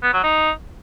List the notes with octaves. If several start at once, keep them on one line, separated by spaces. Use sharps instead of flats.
B3
F#3
D#4